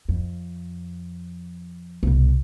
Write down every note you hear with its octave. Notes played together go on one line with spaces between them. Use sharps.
F2
C2 B2